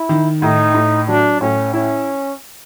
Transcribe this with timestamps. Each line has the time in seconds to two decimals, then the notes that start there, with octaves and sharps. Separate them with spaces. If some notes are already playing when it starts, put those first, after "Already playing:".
Already playing: E4
0.09 D#3
0.42 A2 D#4
0.74 A2
1.08 F#3 D4
1.41 A2 C#4
1.74 C#4 E4